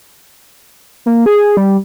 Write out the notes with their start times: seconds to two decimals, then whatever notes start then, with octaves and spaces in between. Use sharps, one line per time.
1.06 A#3
1.26 G#4
1.57 G3